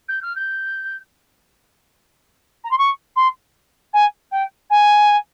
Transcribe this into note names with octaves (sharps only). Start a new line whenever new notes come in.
G6
F6
G6
A#5
C6
C#6
C6
G#5
G5
G#5